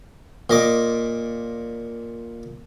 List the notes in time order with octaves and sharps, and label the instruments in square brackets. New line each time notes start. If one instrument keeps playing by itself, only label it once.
[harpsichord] A#2 D#5 D6